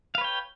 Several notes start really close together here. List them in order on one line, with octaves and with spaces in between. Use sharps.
F5 B4 C#5 G5